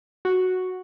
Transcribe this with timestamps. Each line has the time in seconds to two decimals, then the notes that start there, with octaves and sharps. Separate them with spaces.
0.25 F#4